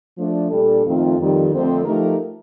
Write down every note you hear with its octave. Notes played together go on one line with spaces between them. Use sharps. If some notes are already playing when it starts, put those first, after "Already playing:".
F3 A3 D4
A#2 G3 D4 A4
F2 D#3 A3 C4 F4
F2 D#3 G3
F2 D3 A3 C4
F3 A3 D#4 G4 A#4